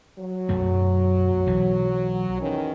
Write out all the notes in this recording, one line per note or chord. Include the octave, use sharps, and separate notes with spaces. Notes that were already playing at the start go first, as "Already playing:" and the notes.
F#3
B1 F#2 A3
B1 E3
E2 D#3 C#4